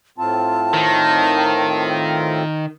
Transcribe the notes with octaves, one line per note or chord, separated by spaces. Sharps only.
A2 C4 F4 A5
D#3